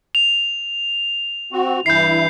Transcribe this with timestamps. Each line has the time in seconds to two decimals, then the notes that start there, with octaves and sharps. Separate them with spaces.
0.15 F7
1.52 C4 F#4
1.86 G2 E3 E4 G6 C7